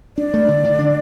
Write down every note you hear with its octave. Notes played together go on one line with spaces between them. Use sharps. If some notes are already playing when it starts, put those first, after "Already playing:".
D4 D5
A3
D3
D3
D4